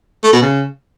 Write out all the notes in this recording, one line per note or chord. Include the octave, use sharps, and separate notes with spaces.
A3
B2
C#3